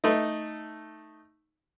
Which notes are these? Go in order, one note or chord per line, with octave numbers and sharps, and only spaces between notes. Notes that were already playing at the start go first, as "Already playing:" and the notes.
A3 D#4